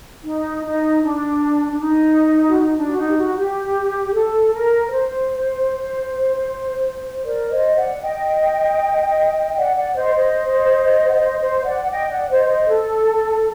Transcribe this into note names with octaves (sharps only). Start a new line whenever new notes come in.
D#4
D#4
D4
D4
D#4
F#4
D#4
D4
F#4
D#4
G4
F#4
G4
A4
A#4
C5
A#4 D5
C5 D#5
D5 F#5
D#5 G5
D5 F#5
D5 F#5
C5 D#5
C5 D#5
F#5
C5 D#5
C5 D#5
D5 F#5
F#5
D#5 G5
D5 F#5
C5 D#5
C5 D#5
A4